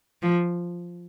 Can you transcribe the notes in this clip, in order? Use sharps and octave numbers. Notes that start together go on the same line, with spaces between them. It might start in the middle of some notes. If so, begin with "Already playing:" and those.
F3